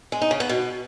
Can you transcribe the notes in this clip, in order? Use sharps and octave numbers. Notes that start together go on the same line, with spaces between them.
G#3
D#4
C#3
B3
B2